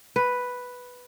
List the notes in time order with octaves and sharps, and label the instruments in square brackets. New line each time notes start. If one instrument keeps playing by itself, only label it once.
[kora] B4